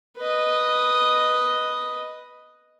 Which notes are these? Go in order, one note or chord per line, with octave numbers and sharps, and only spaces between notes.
B4 D#5